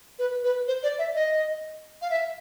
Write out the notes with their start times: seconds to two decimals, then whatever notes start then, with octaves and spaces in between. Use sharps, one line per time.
0.19 B4
0.43 B4
0.67 C5
0.83 D5
0.98 E5
1.15 D#5
2.02 F5
2.10 E5